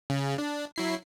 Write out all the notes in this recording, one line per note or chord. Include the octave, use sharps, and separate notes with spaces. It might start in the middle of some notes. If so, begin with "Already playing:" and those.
C#3
D4
F#3 E4 C7